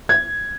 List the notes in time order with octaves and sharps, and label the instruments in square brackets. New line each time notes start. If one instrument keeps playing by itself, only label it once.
[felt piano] G#6